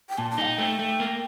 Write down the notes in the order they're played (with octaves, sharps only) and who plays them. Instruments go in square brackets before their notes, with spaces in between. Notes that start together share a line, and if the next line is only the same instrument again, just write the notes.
[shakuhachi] G5
[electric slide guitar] A#2 [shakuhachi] A5
[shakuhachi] A5
[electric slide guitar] D#4 [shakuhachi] F5
[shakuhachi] G5
[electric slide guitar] A3
A3
A#3